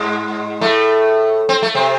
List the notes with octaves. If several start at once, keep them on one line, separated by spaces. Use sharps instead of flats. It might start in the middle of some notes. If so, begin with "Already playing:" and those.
Already playing: G#2 G#3
A2 A3
C4
A3
C3 C4